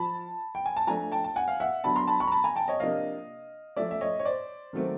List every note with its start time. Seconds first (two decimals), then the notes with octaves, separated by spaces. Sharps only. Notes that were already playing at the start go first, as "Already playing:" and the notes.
Already playing: F3 A5 B5
0.55 G5
0.66 G#5
0.76 A5
0.87 F3 A3 D4 G#5 A#5
1.12 G5 A5
1.24 A5
1.36 F#5 G#5
1.48 F5
1.60 E5 F#5
1.84 D3 F#3 B3 D4 A5 B5
1.96 A#5 C6
2.07 A5 B5
2.20 B5 C#6
2.27 A#5
2.32 A5 B5
2.44 G#5 A#5
2.56 G5 A5
2.68 C#5 D#5
2.80 C3 F3 A#3 D4 D#5 F5
3.76 F3 A3 C#4 D5 E5
3.91 E5
4.01 C#5 D#5
4.19 C#5
4.25 C5 D5
4.73 D#3 F#3 A3 C4